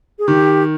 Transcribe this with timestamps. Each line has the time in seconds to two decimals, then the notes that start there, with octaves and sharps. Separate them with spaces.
0.19 G#4
0.27 D#3 G4